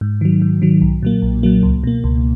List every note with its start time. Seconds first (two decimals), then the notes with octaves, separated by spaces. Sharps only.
0.01 G#2
0.21 D#3 F#3
0.42 G#2
0.62 D#3 F#3
0.82 B1
1.03 A#2 F#3 A#3
1.22 B1
1.43 A#2 F#3 A#3
1.63 C#2
1.84 B2 A#3
2.04 C#2